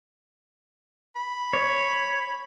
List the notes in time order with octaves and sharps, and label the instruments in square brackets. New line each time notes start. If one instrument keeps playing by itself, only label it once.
[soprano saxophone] B5
[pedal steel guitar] C#5